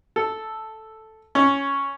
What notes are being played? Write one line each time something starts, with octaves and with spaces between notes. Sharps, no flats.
A4
C#4